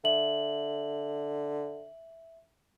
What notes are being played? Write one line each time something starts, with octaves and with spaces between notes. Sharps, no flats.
D3 E5 F#7